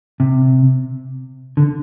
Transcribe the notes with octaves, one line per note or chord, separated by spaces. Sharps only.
C3
D3